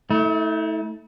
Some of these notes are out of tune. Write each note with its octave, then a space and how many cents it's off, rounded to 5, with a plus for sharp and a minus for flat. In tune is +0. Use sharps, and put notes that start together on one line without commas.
A3 +0 E4 -45